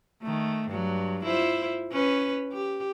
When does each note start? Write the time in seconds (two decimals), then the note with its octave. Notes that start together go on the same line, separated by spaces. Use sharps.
0.22 D#3 A3
0.69 G2 F#3
1.25 E4 F4 C5
1.92 C#4 B4
2.53 G4